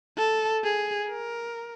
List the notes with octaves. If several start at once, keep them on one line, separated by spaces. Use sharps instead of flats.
A4
G#4
A#4